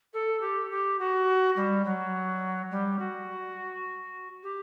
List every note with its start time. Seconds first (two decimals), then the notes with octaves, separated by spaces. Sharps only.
0.13 A4
0.41 G4
0.70 G4
0.99 F#4
1.56 G3
1.84 F#3
2.70 G3
2.99 F#4
4.43 G4